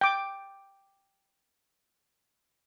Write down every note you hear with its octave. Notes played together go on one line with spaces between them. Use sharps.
G5 D6